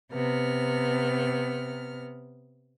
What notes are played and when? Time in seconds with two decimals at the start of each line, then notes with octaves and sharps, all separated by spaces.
0.12 C3 B3 F6